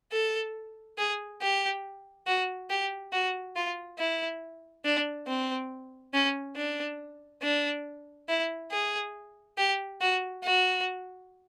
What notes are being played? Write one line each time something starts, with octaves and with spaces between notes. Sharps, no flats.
A4
G#4
G4
F#4
G4
F#4
F4
E4
D4
C4
C#4
D4
D4
E4
G#4
G4
F#4
F#4